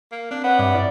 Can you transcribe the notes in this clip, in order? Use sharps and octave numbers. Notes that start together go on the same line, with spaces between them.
A#3
C4 D4
B3 C#5 F#5
G2 D5 E5 D6
E4 D5